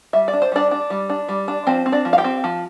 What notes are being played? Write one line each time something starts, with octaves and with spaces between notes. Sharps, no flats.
G3 E5
D5
D4
C5
G3 D4 D5
D4
G3
D4
G3
D4
F3 C4 C5
C4
D4 D5
F3
F5
G4 G5
C4
F3